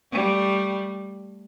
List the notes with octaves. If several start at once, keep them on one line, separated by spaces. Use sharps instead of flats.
G3 A3